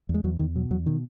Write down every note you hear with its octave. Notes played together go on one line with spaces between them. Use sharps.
E2
G#3
E2 F#3
E2 D#3
B2 F#3
E2 F#3
B2 D#3